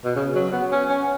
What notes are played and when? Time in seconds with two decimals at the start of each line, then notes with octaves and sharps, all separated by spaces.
0.05 B2
0.16 C#3
0.35 F#3
0.52 B3
0.72 C#4
0.89 C#4